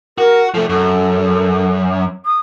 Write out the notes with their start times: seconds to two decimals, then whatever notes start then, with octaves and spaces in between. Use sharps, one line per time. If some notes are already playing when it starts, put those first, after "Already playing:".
0.18 F#4 A#4
0.54 F3 A3 A4
0.69 F#2 A4
2.26 D#6